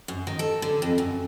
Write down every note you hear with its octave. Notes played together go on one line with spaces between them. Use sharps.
F#2
D#3
A4
D3
F2
F#2